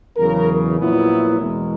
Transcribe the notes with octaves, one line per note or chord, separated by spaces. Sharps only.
E2 C#3 F#3 A#4
A#1 A#2 F#3 B3 E4
A#4
E2 B2 G#3